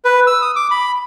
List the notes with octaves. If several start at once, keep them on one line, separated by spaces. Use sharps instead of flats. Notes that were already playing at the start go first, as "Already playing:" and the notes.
B4
E6
D#6
D6
B5